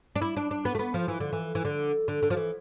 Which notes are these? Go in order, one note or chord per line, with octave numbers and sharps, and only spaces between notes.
D4
E4
D4
D4
B3
A3
B3
F3
E3
D3
E3
E3
D3
D3
D3
F3
E3